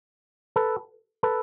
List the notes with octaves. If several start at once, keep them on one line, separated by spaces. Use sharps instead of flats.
A4 B4
A4 B4